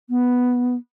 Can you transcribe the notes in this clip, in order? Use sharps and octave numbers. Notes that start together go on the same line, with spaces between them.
B3